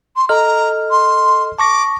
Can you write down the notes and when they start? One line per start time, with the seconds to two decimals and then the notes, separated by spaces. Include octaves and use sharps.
0.16 C6
0.29 A4 D#5 A#5 F6
0.90 C6
1.59 A5 C#6 D6 A#6